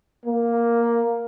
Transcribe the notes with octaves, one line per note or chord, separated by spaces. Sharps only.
A#3